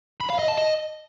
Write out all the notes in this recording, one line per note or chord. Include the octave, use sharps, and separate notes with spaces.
B5
F5
D#5
A5
D#5